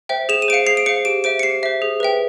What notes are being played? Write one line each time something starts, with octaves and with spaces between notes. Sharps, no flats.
C5 E5 G5
G#4 E7
D#7
C5 F5 C#7 D7
G#4 C7
D7
C5 F5 C#7
G4 D7
C5 E5 D7
C#7
G4 C7
C5 E5
G#4
B4 E5 G5